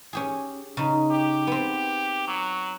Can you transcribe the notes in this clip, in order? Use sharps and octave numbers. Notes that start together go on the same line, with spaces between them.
C#4 G4 G#4
C#3 D#4
G4
B3 C4
F#3